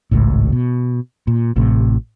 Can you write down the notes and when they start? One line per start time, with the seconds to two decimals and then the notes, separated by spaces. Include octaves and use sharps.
0.11 G#1 C#2 A2
0.52 B2
1.27 A#2
1.56 A1 A2 C3